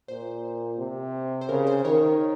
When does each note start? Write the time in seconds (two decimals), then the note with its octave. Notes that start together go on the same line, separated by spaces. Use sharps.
0.08 A#2 C5
0.79 C3
1.41 C5
1.49 C#3 A#4
1.67 C5
1.85 D#3 A#4 C#5